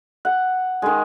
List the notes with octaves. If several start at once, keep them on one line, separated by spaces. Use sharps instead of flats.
F#5
D#3 G#3